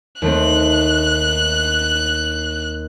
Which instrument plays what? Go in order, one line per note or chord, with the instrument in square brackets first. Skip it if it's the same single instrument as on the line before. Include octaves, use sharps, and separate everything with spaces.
[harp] D#2 A3 C4 [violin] F#6